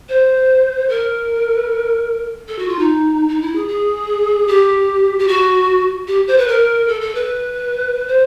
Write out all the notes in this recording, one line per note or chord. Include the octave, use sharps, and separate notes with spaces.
C5
A#4
A4
F#4
F4
D#4
D#4
E4
G#4
G#4
G4
G4
F#4
G4
C5
B4
A#4
A4
A4
B4
C5